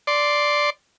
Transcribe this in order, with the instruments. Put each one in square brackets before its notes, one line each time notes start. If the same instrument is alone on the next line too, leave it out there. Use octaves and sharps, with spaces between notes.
[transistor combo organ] D5 C6